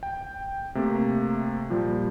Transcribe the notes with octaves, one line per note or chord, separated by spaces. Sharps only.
G5
C3 A3 A#3
A#2 F3 G3